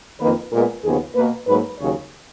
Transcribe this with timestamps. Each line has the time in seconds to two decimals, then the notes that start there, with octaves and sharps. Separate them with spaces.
0.20 F2 D#3 A#3 B4
0.52 A#2 G#3 B3 A#4
0.84 D#2 C#3 F3 B3 G#4
1.15 B2 A#3 B4
1.47 G#2 F#3 A#3 B4
1.80 D#2 C#3 F#3 C#5